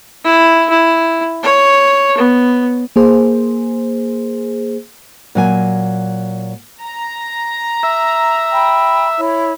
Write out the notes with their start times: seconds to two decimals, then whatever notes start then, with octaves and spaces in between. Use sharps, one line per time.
0.24 E4
0.69 E4
1.43 C#5
2.17 B3
2.96 A#3 G#4 C5
5.35 A#2 F#3 G#5
6.83 A#5
7.83 E5
8.51 G5 B5
9.18 E4 C#5